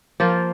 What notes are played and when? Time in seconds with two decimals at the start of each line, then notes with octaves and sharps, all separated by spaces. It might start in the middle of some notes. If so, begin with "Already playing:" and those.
0.20 F3 A#3 F4 C5